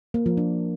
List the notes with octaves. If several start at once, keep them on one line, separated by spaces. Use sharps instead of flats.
A#3
F3
D4